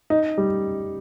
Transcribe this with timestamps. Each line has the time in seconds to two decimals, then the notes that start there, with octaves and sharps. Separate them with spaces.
0.10 D#4
0.38 G3